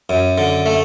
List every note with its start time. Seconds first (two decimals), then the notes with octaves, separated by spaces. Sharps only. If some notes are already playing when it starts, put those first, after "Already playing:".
0.10 F#2
0.38 D3
0.66 A3